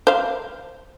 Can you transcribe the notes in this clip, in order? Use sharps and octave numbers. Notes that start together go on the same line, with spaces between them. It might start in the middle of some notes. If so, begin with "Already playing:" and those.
C5 F5